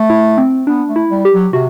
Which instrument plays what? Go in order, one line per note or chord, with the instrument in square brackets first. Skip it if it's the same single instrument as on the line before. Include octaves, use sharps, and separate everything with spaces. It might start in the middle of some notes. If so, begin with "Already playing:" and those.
Already playing: [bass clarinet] A3
[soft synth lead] E4
C4
[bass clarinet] B3 [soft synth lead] D4
[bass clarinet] A3
[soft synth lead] E4
[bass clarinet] G3
[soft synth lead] G4
[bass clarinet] F#3
[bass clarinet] C3 [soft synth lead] F#4